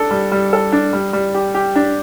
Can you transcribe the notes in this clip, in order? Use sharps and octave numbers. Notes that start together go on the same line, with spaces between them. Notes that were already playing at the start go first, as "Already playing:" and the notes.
Already playing: D4 A4
G3
G3
A4
D4
G3
G3
G4
G4
D4